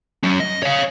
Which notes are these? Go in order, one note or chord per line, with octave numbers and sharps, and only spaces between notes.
F#3 C#4
D#5
C#5 F5